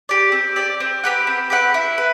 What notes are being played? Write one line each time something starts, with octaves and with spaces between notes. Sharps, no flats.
G4 D5
C4
G4 D5
C4
G4 B4 F#5
C4
G4 B4 F#5
E4
B4